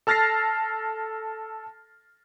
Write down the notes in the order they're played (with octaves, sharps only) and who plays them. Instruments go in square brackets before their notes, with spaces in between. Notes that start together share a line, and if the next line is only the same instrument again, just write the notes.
[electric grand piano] A4 A5 F6 A6 A#6 C7